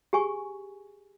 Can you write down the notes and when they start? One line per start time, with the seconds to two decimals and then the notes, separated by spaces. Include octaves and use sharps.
0.13 G4 G#4 G#5 C#6